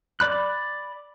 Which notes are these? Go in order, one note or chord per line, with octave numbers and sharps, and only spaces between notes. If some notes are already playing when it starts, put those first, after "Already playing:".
D5 B5 F#6